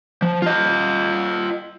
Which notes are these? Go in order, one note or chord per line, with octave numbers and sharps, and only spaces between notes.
F3
F4 D#5